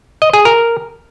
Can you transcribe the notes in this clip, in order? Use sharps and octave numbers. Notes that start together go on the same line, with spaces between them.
D#5
G#4
A#4